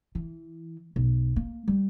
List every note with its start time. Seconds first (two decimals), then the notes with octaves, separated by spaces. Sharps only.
0.15 E3
0.96 B1
1.36 A#3
1.68 G3